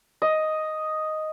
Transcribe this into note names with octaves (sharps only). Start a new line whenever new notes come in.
D#5